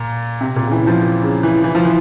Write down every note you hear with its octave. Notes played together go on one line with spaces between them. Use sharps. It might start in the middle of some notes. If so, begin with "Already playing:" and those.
Already playing: A#2
C3
A#2
C#3
E3
F3
C#3
E3
E3
F3
E3